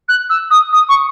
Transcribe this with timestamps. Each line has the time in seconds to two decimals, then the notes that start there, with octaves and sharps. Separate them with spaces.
0.08 F#6
0.29 E6
0.50 D#6
0.72 D#6
0.88 C#6